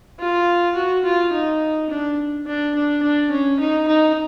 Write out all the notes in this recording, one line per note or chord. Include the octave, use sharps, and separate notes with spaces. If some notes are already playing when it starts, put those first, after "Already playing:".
F4
F#4
F4
D#4
D4
D4
D4
D4
C#4
D#4
D#4